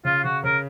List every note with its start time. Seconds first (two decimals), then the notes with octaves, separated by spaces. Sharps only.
0.05 C#3 F4
0.24 C#3 F#4
0.44 C#3 A#4